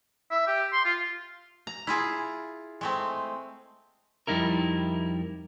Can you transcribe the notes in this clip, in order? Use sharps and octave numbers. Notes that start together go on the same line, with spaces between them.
E5
G4
C6
F4
A#5
E4 F4 G#4
G#3 A3 C4
F2 G3 D#4 E4 A#4